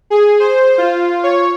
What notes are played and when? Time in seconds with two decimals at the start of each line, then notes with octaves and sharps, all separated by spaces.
0.10 G#4
0.40 C5
0.78 F4
1.23 C#5